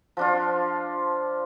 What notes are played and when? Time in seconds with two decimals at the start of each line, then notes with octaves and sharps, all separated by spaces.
0.17 F3 D4 F4